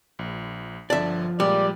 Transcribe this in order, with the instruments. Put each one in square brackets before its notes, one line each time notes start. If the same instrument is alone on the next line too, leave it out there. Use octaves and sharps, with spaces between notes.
[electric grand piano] A#1
[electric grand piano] G1 D3 A5 [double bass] F3 [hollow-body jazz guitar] D5 E5
[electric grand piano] A#2 G#3 [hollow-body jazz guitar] G3 [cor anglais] D5